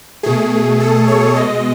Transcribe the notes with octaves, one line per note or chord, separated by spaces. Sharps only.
B2 A3 G#4
A4
C#5
B2 G#3 D#5